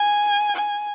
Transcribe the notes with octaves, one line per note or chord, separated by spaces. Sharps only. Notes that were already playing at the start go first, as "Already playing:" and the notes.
Already playing: G#5
G#5